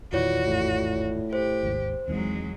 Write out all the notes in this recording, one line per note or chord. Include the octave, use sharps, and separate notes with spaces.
E2 A#2 D#3 E3 F4 F#4 C#5 D5
G#1 E2 A2
G4 C5
G#1 D#2 G#2
G#1 E2 E3 F#3 G#3